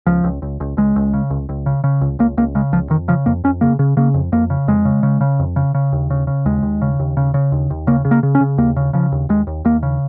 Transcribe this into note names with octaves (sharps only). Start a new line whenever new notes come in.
C#2 F3
C#2
C#2
C#2
C#2 G#3
C#2
C#3
C#2
C#2
C#3
C#3
C#2
C#2 A#3
C#2 A#3
C#3 G#3
C#2 F3
F2 D#3
C#3 F3
F2 A#3
F2 C#4
C#3 A#3
C#3
C#3 A#3
F2
F2 A#3
C#3
F2 G#3
C#3
C#3
C#3
F2
C#3
C#3
D#2
C#3
C#3
D#2 G#3
D#2
C#3
D#2
C#3
C#3
D#2
D#2
C#3 A#3
C#3
A#3
C#3
C#4
C#3
D#2 A#3
C#3
C#3 F3
D#2
D#2 G#3
D#2
D#2 A#3
C#3